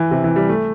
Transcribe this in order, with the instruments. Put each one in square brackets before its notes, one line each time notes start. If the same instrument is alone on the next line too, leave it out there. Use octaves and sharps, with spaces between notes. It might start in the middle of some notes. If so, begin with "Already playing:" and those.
Already playing: [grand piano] E3
C3
E3
G3
A3